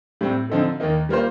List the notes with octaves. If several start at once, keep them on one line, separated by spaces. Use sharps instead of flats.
A2 G3 C4
D3 F3 C4 D#4 A4
D#2 D#3 A#3 D#4
G3 A#3 F4 C5